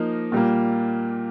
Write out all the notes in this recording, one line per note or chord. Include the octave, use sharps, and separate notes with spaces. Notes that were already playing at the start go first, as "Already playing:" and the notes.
Already playing: F3 A#3 D#4
A#2 G3 A#3